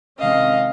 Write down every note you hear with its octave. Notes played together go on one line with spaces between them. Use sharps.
C3 D#3 G#3 C#4 D#5 F5